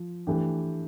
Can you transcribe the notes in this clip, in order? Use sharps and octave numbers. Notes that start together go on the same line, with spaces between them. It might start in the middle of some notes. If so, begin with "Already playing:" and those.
Already playing: F3
E3 A3 D4 G4